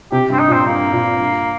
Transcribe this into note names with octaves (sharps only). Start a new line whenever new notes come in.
C3 G4
G2
C4
D#4
A#2
C4
G2 A#3
A#2
G2